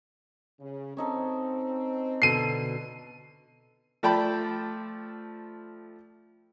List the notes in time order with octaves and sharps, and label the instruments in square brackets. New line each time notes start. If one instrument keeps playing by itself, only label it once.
[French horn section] C#3
[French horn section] C4 [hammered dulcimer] C#4 D#4 A4
[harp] B2 D3 A4 [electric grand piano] C7 D#7
[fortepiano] F3 A3 D5 G5 A5 B5